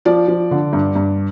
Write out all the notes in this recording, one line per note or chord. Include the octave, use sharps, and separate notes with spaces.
F3 D5
F3
D3
G2
G2